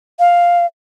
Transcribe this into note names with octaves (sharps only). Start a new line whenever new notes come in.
F5